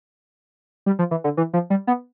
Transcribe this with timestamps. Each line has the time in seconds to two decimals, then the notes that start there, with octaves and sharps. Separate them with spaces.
0.86 G3
0.99 F3
1.11 E3
1.24 D3
1.37 E3
1.53 F3
1.70 G3
1.87 B3